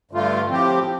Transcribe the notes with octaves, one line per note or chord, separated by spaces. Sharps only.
G2 D3 A3 F4
A2 F3 C4 G4